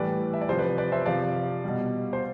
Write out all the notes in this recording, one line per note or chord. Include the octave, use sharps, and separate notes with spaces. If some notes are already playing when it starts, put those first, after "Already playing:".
Already playing: A2 E3 G3 B4 D5
E5
D5
C3 F3 C5
B4 D5
C5
B4 D5
C5 E5
C3 F3 D5 F5
B2 G3
C5